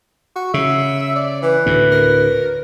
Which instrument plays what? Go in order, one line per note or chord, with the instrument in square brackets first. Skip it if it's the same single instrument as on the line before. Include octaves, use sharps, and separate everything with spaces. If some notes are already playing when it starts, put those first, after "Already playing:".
[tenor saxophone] F#4
[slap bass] C#3 [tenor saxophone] E5
[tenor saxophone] D5
[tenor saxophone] E3 [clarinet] B4
[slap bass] D2 A2
[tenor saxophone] A#4